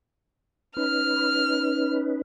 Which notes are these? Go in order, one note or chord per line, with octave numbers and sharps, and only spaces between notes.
C#4 D#4 B4 F6